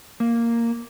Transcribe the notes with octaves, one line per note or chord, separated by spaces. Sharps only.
A#3